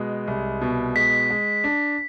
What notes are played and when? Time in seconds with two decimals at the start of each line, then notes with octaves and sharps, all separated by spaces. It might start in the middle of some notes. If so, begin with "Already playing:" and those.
Already playing: B2 G#3
0.28 C2
0.62 B2
0.96 G#3 B6
1.30 G#3
1.64 D4